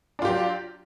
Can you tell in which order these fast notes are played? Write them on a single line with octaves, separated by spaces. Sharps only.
D4 F4 G4 F#3